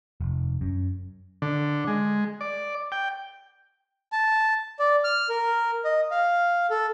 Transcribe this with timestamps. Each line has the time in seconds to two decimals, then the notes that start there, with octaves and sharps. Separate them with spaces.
0.21 F1
0.61 F#2
1.42 D3
1.87 G#3
2.41 D5
2.92 G5
4.12 A5
4.79 D5
5.04 F6
5.29 A#4
5.85 D#5
6.11 F5
6.70 A4